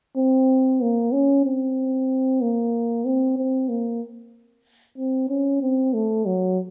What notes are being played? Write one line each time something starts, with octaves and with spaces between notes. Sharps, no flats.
C4
A#3
C#4
C4
A#3
C4
C4
A#3
C4
C#4
C4
A3
F#3